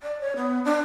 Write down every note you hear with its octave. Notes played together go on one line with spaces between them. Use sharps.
D5
C#5
B3
D4